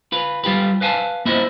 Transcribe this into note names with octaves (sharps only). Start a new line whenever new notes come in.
F4 B4
G3 F4 G4 B4
B4 F5 G#5 A5
A#3 E4 F4 C5 D#5